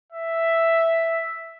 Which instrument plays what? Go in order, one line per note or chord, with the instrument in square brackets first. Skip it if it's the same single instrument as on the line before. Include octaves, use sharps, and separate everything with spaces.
[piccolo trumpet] E5